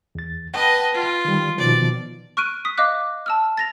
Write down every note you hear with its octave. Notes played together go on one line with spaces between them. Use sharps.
E2 A6
B4 D#5 F#5 G5 A5
F4
D#3 G3
B2 D#3 F3 D5
C#6 F6 F#6 D7 D#7
D#6 B6
D#5 F5 D6 F#6
A5 E6 F6
A6 A#6 F7